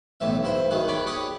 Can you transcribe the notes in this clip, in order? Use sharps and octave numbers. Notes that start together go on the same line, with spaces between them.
B1 A2 E3 E5
G2 E4 C5
D#3 F#3 G#4 F#5
B4 C#5 D5 F#5 G5
G4 G#4 C#5 D#5 F#5